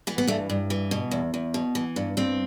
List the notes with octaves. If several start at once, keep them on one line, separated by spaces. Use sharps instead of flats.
E3 B3
B3
G2 A3
G2
E3
B2
E2
E2
B2
E3
G2
G2 C4